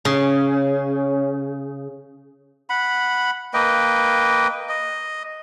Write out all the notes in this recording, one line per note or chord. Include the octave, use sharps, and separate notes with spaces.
C#3 C#4
F#5 B5
A#3 B4 D#5 G5
D#5